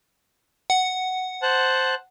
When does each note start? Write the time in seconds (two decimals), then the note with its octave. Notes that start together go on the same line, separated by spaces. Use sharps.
0.70 F#5
1.42 C5 A5 F#6